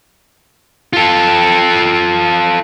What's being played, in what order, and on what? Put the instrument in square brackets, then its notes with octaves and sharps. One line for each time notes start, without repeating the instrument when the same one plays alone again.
[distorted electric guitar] F4 A4